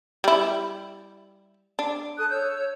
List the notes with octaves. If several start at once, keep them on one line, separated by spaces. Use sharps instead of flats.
G3 E4
D4
A4 D#6 F#6
C#5 E6 G6